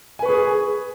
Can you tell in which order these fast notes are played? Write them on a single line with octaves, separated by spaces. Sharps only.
G#5 B4 C#6 G#4